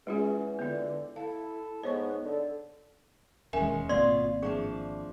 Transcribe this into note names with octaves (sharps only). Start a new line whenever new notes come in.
E2 G#3 C#4 F4 G#4
D3 B3 F4
E4 A4 F5
G#2 B3 C#5 D#5 C#6
D3 A4
E1 D#2 E3 G#3 C#4 A#4 E5 G#5
G#1 B2 A#3 C4 F4 D5 C6
E3 F3 D4 G#4